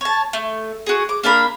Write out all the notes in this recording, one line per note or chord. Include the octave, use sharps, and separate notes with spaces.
C#5 A5
A3
F#4 G#4
D6
A#3 D4 A#4 B5